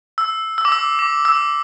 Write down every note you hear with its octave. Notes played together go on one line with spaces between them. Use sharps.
E6
E6
D6
E6
D6
E6